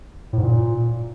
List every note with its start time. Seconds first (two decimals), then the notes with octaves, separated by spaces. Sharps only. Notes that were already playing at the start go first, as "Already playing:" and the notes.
0.33 A2
0.38 G#2
0.43 A#2